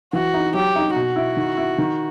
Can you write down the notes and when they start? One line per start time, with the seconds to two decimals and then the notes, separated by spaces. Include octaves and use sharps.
0.13 E3 F#4
0.34 D#4
0.54 F#3 G4
0.76 D#4
0.95 B2 F#4
1.16 E4
1.37 D#3
1.57 E4
1.78 D#3